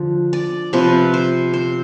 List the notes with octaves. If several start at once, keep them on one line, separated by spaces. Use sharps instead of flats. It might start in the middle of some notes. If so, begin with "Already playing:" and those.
Already playing: D3 F3
D5
C3 F3 C4 B4
C5
C5